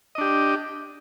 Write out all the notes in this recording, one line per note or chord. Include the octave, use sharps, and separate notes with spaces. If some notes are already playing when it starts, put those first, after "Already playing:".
D4 G4 D#5